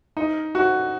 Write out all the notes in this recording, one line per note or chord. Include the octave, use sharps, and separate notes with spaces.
D#4
F#4